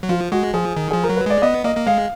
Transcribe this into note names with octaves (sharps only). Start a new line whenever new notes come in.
F#3
F3 F4
G#3 F#4
F3 G#4
D#3
F3 G#4
A#4
F#3
B4
G#3 D5
B3 D#5
A#3 D#5
A#3
G#3 F5